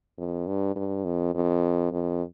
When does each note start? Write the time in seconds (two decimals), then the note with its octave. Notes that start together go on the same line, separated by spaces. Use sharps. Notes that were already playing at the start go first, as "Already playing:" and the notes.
0.18 F2
0.47 G2
0.76 G2
1.05 F2
1.35 F2
1.92 F2